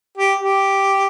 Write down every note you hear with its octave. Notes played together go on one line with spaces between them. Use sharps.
G4
G4